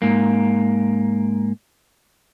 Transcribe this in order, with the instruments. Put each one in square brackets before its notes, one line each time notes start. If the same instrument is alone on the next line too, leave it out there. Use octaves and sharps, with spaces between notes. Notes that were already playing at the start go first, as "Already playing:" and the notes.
[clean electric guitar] G#2 A#3